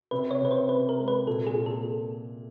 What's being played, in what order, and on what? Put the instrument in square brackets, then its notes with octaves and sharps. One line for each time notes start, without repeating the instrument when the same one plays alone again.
[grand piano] C3 [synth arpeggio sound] B4
[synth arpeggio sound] C#5
[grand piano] C3 [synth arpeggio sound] B4
[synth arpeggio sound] C5
[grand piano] C3 [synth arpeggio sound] B4
[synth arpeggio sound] A#4
[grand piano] G#3
[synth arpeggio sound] B4
[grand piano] A#2 [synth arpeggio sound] A4
[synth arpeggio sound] G#4
[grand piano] A#2
[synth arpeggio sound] A4